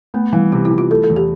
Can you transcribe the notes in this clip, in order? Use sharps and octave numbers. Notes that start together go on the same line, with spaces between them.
A3 B3
E3 G3
C3 E4
E4
E3
F4
A3 A4
A4
E2
G4